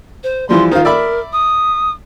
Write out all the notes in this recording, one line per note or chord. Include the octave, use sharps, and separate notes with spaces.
C5
E3 F3 G3 C6
D#3 F4 C5
A#4 D5 E5 B5
D#6